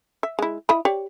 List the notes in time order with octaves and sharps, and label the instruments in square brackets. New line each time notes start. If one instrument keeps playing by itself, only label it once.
[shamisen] E5
G#3 E4
E4 D#5 B5
G4 C#5 D5